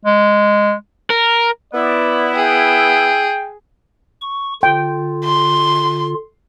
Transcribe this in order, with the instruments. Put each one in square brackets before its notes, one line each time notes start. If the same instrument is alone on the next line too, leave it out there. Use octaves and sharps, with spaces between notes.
[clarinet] G#3
[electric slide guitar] A#4
[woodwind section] B3 E4 [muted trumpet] D5
[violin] G#4 [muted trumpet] G5
[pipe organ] C#6
[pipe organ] D3 F4 [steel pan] G5
[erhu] C6